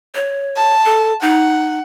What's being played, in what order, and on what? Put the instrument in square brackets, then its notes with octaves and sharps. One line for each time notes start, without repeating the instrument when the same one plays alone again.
[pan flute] C#5
[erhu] A5
[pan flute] A4
[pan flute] D#4 [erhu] F#5